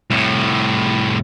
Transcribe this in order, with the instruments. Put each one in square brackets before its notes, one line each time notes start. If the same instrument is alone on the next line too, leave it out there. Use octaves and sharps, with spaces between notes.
[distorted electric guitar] C2 A2